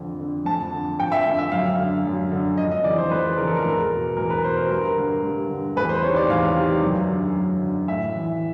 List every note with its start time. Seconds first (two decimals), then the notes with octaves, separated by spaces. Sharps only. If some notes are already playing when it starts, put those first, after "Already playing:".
Already playing: F2 D3
0.19 D3
0.45 F2 A5
0.73 D3
0.99 F2 G5
1.12 E5
1.26 D3
1.39 E5
1.52 F#2 F5
1.79 D3
2.05 F#2
2.32 D3
2.57 F2 D#5
2.71 D#5
2.84 C#3 E3 D5
2.98 C5
3.11 F2 B4
3.37 C#3 E3 A#4
3.47 A4
3.56 A#4
3.65 E2
3.91 B2
4.17 E2 A#4
4.30 B4
4.43 B2 C5
4.57 A#4
4.70 G2 A#4
4.97 D3
5.23 G2
5.50 D3
5.76 E2 B4
5.89 C5
6.03 C3 D#3 C#5
6.16 D5
6.29 E2 F5
6.56 C3 D#3
6.82 F#2
7.08 D3
7.36 F#2
7.62 D3
7.88 A2 E5
8.15 E3